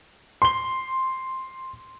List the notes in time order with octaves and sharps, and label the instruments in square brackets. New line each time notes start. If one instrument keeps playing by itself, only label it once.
[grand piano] C6 G7